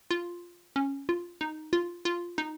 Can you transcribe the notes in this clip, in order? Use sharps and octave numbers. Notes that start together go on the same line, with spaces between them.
F4
C#4
F4
D#4
F4
F4
D#4